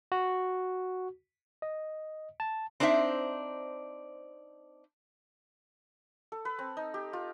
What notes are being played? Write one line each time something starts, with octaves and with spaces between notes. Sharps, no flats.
F#4
D#5
A5
C4 D4 D#4 C5 E5
A4
B4
C4
D#4
G4
F4